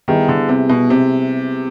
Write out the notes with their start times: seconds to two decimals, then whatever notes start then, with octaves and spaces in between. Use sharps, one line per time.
0.08 D#3 G3 B3 E4 G#4
0.28 D3
0.49 C3
0.69 B2
0.90 C3